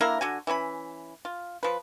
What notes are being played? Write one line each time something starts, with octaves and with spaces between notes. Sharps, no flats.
D3 A#3 E4 A#4
D3 F#4 G#5
E3 A3 C#4 B5
F4
F3 B4